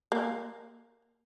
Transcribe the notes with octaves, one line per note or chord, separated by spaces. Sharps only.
A#3